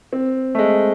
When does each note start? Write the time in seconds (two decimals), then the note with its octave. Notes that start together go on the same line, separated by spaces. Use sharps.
0.13 C4
0.55 A3
0.59 G#3